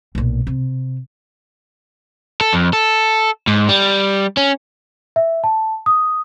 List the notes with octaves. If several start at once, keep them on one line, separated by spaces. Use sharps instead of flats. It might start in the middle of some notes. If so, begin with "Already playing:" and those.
B1 A#2
C3
A4
F2
A4
G#2
G3
C#4
E5
A5
D#6